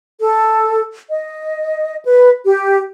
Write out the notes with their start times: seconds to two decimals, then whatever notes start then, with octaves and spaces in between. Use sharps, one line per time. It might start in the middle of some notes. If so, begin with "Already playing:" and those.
0.20 A4
1.09 D#5
2.04 B4
2.45 G4